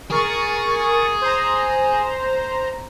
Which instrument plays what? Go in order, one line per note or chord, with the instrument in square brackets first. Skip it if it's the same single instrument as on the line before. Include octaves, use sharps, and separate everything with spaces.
[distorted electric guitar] G#4 [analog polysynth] A#4 C#6 A6
[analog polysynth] C5 A#5